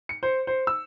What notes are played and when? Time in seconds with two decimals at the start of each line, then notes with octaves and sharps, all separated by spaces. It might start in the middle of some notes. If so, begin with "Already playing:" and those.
0.09 C#7
0.23 C5
0.47 C5
0.67 E6